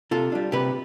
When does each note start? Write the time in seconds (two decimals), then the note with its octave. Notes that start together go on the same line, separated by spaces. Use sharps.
0.11 C3 F4 A4
0.32 G3 D4
0.52 C3 G4 B4